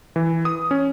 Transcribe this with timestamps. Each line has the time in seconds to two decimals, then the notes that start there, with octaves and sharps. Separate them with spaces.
0.16 E3
0.45 D#6
0.71 C#4